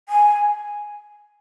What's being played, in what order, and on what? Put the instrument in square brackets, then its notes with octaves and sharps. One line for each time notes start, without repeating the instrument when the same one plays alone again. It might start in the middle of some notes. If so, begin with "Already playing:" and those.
[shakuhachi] G#5